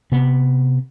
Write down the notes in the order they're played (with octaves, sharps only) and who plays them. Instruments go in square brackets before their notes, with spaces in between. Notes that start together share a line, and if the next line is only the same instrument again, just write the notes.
[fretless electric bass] C3 B3